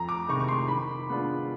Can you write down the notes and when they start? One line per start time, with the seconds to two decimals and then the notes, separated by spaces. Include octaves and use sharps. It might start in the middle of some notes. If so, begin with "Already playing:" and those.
Already playing: F2 A#5
0.09 D6
0.29 C3 D#3 G#3 C#6
0.39 C#6
0.48 C6
0.68 D#3 B5
1.09 G#3 B3 D4 F4